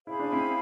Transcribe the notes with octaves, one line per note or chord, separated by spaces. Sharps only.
E4 G#4 C5 F5 B5
D4
C4 E4